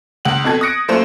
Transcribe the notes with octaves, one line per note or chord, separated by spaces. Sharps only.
C#2 F#5 F#7
F2 B2 A4 G#6
D#6 F#6 A#6 C#7 D7
F#2 A3 A#3 C5